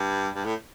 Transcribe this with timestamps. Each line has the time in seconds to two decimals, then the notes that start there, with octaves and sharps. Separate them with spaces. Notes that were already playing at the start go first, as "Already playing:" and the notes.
Already playing: G2
0.35 G2
0.45 A2